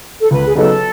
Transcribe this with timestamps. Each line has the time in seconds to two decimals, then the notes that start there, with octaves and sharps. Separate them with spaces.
0.21 A4
0.31 C#2 B4
0.45 G#4
0.55 C#3 F#3 B3 D#4 A4